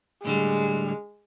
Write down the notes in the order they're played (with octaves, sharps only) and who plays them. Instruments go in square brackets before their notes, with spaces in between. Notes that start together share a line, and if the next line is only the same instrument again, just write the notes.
[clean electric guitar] A2 D3 G3 [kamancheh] G#3